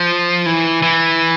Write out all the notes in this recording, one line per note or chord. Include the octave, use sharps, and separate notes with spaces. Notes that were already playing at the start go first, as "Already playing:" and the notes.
Already playing: F3
E3
E3